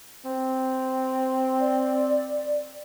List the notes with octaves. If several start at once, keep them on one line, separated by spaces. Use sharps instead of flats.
C4
D5